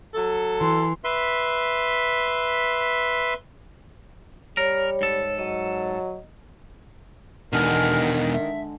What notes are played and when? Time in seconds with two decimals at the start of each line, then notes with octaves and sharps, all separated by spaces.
0.15 F#3 A4
0.61 E3 C6
1.04 B4 E5 C6
4.57 G3 A#4 C#5
5.01 G#2 A4
5.39 F#3 D#5
7.53 E2 B2 D3 D#3 G#3 F6
8.32 E5